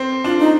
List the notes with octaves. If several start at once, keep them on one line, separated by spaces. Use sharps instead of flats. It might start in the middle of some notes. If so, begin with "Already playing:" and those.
Already playing: C4
D4 F4
D#4